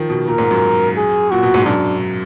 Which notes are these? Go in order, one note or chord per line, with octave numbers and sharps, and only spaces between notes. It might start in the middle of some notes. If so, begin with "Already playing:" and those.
Already playing: D#3 F3
B2
A#2 A#4
G#2
F#2
G#4
A#2 F#4
B2
G#2
F#2 D4